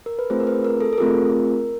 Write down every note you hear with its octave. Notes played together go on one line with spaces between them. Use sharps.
A#4
B4
A3 C4 F4 G#4 C5
A#4
B4
A#4
A4
A4
A3 C4 F4 G#4 A#4